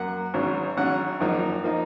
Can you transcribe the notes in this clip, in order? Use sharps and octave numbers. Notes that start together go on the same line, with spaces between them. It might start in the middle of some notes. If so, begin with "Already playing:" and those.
Already playing: F#2 A#3 F#5
G#1 G#2 F#3 C#4
G#1 G#2 F#3 C#4 F#5
G#1 F#2 F3 A#3 D#4
F3 A#3 D#4